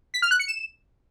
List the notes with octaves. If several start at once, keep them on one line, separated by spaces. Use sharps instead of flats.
B6
F6
F#6
C#7
E7